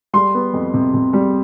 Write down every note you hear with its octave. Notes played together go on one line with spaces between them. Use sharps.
G3 C6
B3
F2
C3
C3
G3